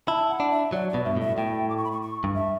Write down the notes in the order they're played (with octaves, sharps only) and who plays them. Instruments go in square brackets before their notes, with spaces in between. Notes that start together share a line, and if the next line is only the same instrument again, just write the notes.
[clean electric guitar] E4 [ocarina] A5
[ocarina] F#5
[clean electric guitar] D4
[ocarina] E5
[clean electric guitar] F#3 [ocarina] D5
[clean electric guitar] B2 [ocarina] D5
[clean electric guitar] G2 [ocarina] E5
[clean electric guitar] A2 [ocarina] E5
[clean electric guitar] A2 [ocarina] G5
[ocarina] D6
C#6
B5
C#6
C#6
[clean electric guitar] G2
[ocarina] E5